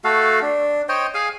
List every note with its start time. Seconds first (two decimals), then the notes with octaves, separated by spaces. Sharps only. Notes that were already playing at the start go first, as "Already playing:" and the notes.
0.04 A3 F#4 A4 F5
0.42 D4
0.89 C5 C#5 D#5 G5
1.14 G#4 F5 G#5